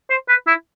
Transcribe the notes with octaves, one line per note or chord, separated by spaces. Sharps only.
C5
B4
E4